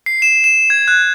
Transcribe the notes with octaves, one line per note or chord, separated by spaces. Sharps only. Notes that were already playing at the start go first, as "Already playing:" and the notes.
C7
E7
E7
G#6
F#6